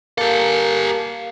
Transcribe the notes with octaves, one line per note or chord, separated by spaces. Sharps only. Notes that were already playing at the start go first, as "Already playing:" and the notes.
A#3 G4 A4